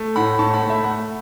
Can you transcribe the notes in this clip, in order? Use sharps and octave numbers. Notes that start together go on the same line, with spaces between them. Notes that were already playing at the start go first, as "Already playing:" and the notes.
Already playing: A3
A2 F#5 B5
A2 A5 C#6
F#5 B5
A3
E5 A5
A3 F#5 B5